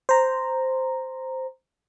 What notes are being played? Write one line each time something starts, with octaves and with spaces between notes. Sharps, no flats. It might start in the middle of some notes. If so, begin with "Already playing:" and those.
C5 A#5